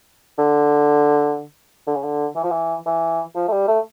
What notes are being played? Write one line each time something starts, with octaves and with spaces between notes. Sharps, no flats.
D3
D3
C#3
D3
E3
F3
E3
E3
F3
A3
G3
A3